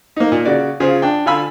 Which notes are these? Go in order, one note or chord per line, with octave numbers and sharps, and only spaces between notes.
A#3 D#4
A#2
C#3 F#4 D5
C#3 F4 G#4 C5
D4 G5
D3 F4 F5 G#5 B5 E6